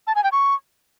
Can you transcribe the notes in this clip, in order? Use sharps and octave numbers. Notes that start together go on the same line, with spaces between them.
A5
G#5
G5
C#6